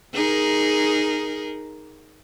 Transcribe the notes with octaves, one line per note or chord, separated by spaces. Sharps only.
D#4 G#4 A#4